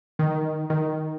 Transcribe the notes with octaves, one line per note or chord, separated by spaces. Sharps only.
D#3
D#3